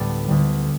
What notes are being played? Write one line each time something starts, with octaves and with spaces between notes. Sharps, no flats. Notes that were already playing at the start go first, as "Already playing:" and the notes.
Already playing: D2 A2 D3 G3 B3 A4 D5
D2 D3 G3